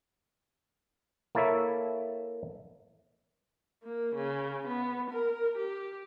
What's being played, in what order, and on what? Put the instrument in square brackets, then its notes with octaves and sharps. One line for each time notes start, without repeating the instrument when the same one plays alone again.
[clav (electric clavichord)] A#3 E4 A4 C#5 E5
[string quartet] A#3
C#3
B3
A#4
G4